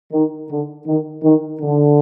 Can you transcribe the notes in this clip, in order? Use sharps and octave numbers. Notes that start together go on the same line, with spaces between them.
D#3
D3
D#3
D#3
D3